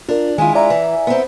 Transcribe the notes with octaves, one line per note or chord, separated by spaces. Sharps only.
D4 F4 A#4
D#3 G#3 E4 F4 G#5
D5 E5 G#5 A#5
E3
B3 C4